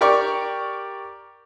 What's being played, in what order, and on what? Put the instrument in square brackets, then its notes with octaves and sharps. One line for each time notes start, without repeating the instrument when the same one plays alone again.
[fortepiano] G4 A#4 D5 C#6